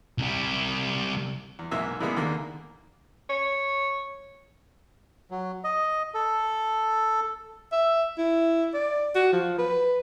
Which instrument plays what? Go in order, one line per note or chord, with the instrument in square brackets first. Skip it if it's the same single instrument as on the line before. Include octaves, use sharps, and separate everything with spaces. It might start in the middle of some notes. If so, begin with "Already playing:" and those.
[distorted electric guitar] C2 G3
[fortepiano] E2
B1 G#2 A#3 E5
E3 G3 G#3 A#3 B3
D#2 D3 A#3
[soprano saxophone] C#5
[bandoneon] F#3
D#5
A4
[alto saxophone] E5
E4
D5
F#4
F3
B4